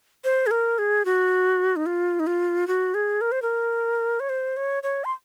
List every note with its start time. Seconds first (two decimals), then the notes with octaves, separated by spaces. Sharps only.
0.24 C5
0.47 G#4
0.51 A#4
0.78 G#4
1.05 F#4
1.76 D#4
1.86 F4
2.20 D#4
2.27 F4
2.67 F#4
2.94 G#4
3.21 A#4
3.32 C5
3.42 A#4
4.20 C#5
4.29 C5
4.57 C#5
4.83 C#5
5.05 C6